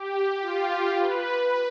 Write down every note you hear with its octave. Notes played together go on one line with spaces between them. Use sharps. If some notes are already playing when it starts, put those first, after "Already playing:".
Already playing: G4
F4
B4